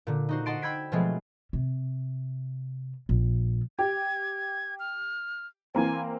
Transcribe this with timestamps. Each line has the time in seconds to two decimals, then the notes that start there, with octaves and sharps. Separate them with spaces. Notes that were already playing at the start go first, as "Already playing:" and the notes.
0.07 A#2 D3
0.29 D#4 F#4 C5
0.46 D#5 F#5 A5 C6 A6 D7
0.62 G5 B5 E6 G#6 B6 D7
0.92 B2 F3 F#3 G#3 A3 C4
1.53 C3
3.09 A#1
3.79 G4 G#6
4.79 F6
5.75 E3 A#3 C4 G#5